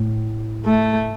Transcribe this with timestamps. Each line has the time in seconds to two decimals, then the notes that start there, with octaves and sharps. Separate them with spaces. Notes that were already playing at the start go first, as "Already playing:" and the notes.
Already playing: A2
0.66 A3